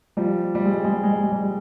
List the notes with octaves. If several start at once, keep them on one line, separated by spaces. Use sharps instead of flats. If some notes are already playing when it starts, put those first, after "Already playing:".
F3 G3
G3
G#3
G3
G#3
G3
G#3
G3
G#3
G3
G#3